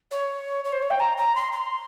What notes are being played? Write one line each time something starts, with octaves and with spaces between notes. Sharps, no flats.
C#5
C#5
C5
C#5
G5
A#5
A#5
C6
C6